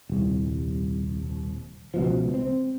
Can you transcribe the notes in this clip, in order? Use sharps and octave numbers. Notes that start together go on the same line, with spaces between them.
D#1 C2
C#2 B2 F3
C4